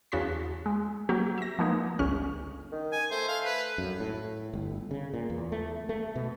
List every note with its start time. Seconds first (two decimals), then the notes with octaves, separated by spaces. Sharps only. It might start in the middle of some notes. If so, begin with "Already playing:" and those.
0.12 E2 C#3 F#4 A5 C6 B6
0.66 G#3
1.09 F#3 A#3 F#4 G4
1.38 E5 A#6
1.59 F3 G#3 A#3 B3 D#4
1.99 G1 C#2 C#4 F6
2.72 D#3
2.93 G#5
3.11 A3 C5
3.29 F5
3.45 B4
3.78 F#2
4.00 A2
4.53 G1
4.91 C#3
5.14 A#2
5.30 E2
5.52 A3
5.89 A3
6.15 B2